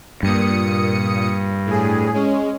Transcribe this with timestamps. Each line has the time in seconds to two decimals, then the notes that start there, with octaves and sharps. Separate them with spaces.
0.23 G2 A#2 D#6 C#7
1.66 A2 G#4
2.14 G#3 C#4